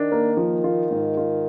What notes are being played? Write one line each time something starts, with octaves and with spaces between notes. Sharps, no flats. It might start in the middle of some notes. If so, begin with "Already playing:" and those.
Already playing: D#3 D4
A#3
F3
F4
G#2
F4